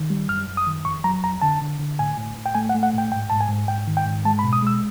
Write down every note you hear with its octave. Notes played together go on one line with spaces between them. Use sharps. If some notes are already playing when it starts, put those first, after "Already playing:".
Already playing: D#3
G3
F#2 F6
F#2
D#6
D#3
F2 C#6
F#3 A#5
F2 A#5
D3 A5
D3
D3
A2 G#5
A2
A2
G5
A3 G#5
F#5
A3
F#5
A2
G5
G#2 G5
G#2 A5
G#5
G#2
G#2 G5
D#3
G5
G#2
G#3 A5
B5
B2
D#6
G#3 E6